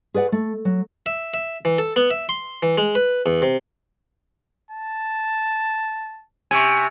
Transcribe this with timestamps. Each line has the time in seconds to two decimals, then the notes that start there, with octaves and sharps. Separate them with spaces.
0.14 G#4 B4 D5 F#5
0.32 A3
0.65 F#3
1.06 E5
1.34 E5
1.65 E3
1.78 A4
1.96 B3
2.11 E5
2.29 C6
2.63 E3
2.78 G#3
2.95 B4
3.26 E2
3.42 C3
4.71 A5
6.51 C3 G#5 C#6